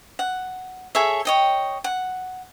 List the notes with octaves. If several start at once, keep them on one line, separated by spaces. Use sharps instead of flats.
F#5
G#4 A4 C#5 E5
C#5 D#5 G5
F#5